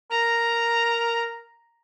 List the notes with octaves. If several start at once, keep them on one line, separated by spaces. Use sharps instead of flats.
A#4 A#5